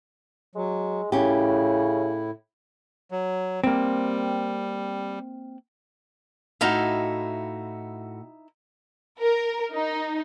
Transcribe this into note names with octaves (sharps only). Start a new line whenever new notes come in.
F#3 G#3
A2 C#3 C#4 E4 G4
F#3
G3 A#3 C4
A2 D#4 E4 F#4 F5
A#4
D#4